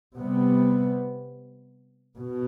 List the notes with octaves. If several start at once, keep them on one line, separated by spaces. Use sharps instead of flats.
C3 G3 B3
B2